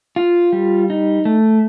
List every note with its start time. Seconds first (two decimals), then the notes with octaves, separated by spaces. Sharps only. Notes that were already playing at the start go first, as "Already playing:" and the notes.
0.16 F4
0.52 G3
0.90 D#4
1.25 A3